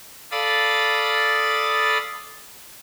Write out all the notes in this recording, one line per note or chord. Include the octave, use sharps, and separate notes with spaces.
A4 D5 F5 B5 D#6 A6